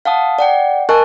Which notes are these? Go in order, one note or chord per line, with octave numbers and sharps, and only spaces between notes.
F5 F#5 A5 D#6
D5 F#5 G5
A#4 D#5 G#5 A5 C#6 F#6